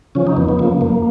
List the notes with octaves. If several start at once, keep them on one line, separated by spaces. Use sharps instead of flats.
C#3 F3 C#4
D#4
F2 B3
B3
C#3 F3 A#3
F#2 A#3